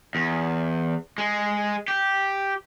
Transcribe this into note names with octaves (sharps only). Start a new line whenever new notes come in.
E2
G#3
G4